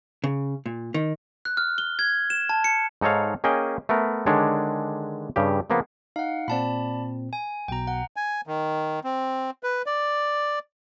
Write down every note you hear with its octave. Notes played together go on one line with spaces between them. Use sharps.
C#3
A#2
D#3
F#6
F6
G7
G#6
E7
A5
C#7
G#2 D#4 A4 C#5 F5
A#3 C#4 G#4 D#5 G5
A3 B3 A#4
D3 D#3 G#3 D4 C#5
G2 C#3 G4
C#3 F3 A#3 B3
D#4 F5 F#5
A#2 C4 D5 A5 B5
G#5
B1 B2 G5 A#5
F#5
G#5
D#3
C4
B4
D5